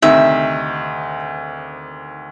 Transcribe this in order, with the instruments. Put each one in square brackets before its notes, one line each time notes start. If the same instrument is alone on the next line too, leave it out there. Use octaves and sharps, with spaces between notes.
[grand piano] D2 C3 D#3 [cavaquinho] E5